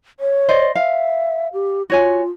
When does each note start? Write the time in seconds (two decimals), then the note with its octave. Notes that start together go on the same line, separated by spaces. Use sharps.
0.20 C#5
0.49 C5 D5 D#5
0.75 E5 F5
1.53 G4
1.90 F4 F#4 C#5 G#5